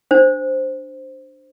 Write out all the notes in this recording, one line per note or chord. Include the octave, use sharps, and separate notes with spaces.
D4 C5